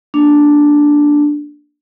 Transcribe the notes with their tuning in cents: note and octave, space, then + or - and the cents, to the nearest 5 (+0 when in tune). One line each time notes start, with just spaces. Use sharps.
A#3 +0 D4 +0